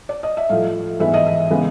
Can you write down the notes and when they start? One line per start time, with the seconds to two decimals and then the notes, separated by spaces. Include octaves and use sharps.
0.09 D5
0.23 D#5
0.37 E5
0.49 A2 F3 A3 F5
0.99 G#2 E3 G#3 B3 E5
1.14 D#5
1.27 E5
1.50 C#3 E3 G#3 B3